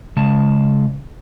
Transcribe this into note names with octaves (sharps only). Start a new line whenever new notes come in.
C#3 G#3 A5